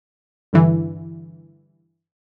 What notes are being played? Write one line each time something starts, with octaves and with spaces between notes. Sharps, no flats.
G2 D3 E3